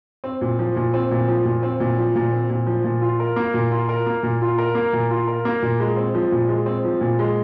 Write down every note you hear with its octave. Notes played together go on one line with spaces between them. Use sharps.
C4
A#2
F3
A#2
C4
A#2
F3
A#2
C4
A#2
F3
A#2
C4
A#2
F3
A#2
F4
A#4
A#3
A#2
F4
A#4
A#3
A#2
F4
A#4
A#3
A#2
F4
A#4
A#3
A#2
G#3
C4
F3
A#2
G#3
C4
F3
A#2
G#3